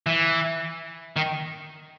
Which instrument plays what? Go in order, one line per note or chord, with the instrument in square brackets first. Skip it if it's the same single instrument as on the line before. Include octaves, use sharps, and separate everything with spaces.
[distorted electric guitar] E3
D#3